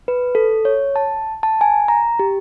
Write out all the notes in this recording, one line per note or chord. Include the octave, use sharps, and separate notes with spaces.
B4
A4
C#5
A5
A5
G#5
A#5
G4